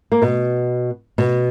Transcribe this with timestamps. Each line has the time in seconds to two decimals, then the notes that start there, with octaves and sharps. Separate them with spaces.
0.12 A#3
0.22 B2 B3
1.18 B2 B3